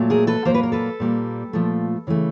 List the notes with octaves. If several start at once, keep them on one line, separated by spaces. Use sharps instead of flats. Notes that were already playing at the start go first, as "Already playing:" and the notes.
Already playing: A#2 F#3 A3
G#4 A#4
A4 B4
A#2 F#3 A#3 C5
B4
A#4
A4 B4
A#2 G3 A#3
A#2 F3 A3
C#3 E3 A3